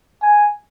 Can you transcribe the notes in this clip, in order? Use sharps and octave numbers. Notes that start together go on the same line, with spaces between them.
G#5